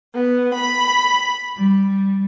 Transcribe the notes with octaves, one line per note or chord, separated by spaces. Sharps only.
B3
B5
G3